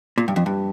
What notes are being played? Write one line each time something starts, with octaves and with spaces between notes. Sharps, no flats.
A#2
G2
F2
G2